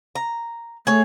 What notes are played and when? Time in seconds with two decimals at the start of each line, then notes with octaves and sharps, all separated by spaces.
0.15 A#5
0.87 A3 G#4 C#5